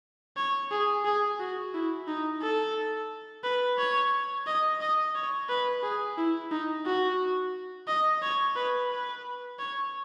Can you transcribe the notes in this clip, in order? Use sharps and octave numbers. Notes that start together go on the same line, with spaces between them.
C#5
G#4
G#4
F#4
E4
D#4
A4
B4
C#5
D#5
D#5
C#5
B4
G#4
E4
D#4
F#4
D#5
C#5
B4
B4
C#5